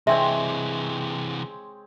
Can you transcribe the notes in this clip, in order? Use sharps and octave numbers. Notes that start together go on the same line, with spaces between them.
C3 E3 G#3 C4 C#5 E5